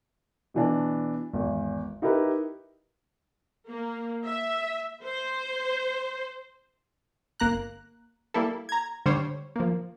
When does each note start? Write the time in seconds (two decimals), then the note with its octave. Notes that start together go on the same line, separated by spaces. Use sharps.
0.54 B2 E3 D4
1.33 G#1 E2
2.02 D#4 E4 G4 A#4 B4
3.68 A#3
4.24 E5
5.03 C5
7.40 G1 A#3 A#5 F#6
8.34 G3 A#3 E4 A4
8.69 A#5 G#6
9.06 D3 G3 C5 C#5
9.56 F3 A#3